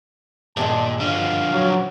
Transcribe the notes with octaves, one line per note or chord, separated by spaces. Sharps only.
G2 A#2 D#3 G#3 A5
D3 F3 F5
F#3